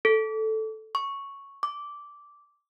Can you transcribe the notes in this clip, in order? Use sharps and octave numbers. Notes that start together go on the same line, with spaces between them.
A4
C#6
D6